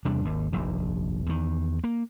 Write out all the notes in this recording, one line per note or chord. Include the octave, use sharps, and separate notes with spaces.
E2 C3 G3 D4
G#1 D#2
F1 A#1 D#2
E2 D#3
A#3